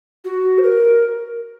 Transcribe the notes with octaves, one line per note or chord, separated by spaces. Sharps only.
F#4
C5
A#4